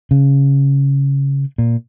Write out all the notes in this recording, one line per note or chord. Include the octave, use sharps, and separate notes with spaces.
C#3
A#2